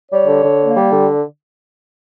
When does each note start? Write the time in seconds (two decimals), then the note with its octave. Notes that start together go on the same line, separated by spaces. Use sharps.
0.11 G3 C#5
0.27 D3
0.45 D3
0.60 A#3
0.76 G3
0.92 D3